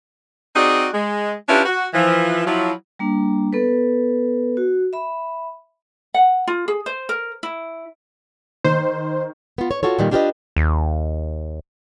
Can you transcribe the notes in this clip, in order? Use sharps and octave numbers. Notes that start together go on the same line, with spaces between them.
C4 D#4 F#4 G#4 D5
G#3
C#4 D4 E4 F4 G4 B4
F#4
E3 F3
F3 F#3 E4
G3 A#3 D4
B3 A4 B4
F#4
E5 B5
F#5
F4
G#4
C5
A#4
E4
D#3 C5
B3 F4
C#5
F4 F#4 A4 C#5
A#2 D#3 G3
D4 F4 G4 A4 B4 D#5
D#2